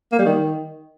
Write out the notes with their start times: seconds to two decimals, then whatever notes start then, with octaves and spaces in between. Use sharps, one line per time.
0.12 A#3
0.19 G3
0.25 D#3